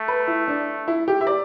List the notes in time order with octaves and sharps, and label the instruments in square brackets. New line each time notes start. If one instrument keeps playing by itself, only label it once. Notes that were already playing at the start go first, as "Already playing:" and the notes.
Already playing: [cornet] A3
[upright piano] B4
E4
D4
E4
G4
E5
D5